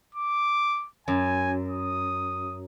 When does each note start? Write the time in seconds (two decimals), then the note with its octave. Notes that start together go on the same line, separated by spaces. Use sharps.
0.15 D6
1.08 F#2 G#5
1.70 D#6